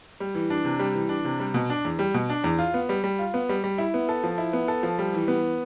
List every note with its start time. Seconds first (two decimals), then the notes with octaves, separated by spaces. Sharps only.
0.20 G3
0.35 E3
0.50 D4
0.65 C3
0.79 G3
0.94 E3
1.09 D4
1.25 C3
1.40 G3
1.54 B2
1.70 D4
1.85 E2
1.99 G3
2.14 B2
2.30 D4
2.44 E2
2.59 F4
2.74 B3
2.89 G3
3.04 G3
3.19 F4
3.34 B3
3.49 G3
3.64 G3
3.78 E4
3.94 B3
4.09 A4
4.24 F3
4.38 E4
4.53 B3
4.68 A4
4.83 F3
4.99 G3
5.14 E3
5.28 B3